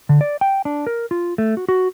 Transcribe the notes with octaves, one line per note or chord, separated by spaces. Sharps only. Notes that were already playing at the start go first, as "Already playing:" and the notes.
D3
D5
G5
D4
A#4
F4
A3
F#4
F#4